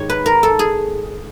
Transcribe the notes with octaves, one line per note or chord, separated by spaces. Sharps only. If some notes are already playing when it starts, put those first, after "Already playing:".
Already playing: G#2 D#3 G4 C#5
B4
A#4
A4
G#4